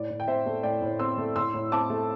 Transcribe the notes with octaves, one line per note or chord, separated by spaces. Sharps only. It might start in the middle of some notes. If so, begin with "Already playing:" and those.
Already playing: A2 D5
A2
G5
C4 C5 E5
A3
A2 D5 G5
A2
C4 C6 E6
A3
A2 C6 E6
A2
C4 A5 D6
A3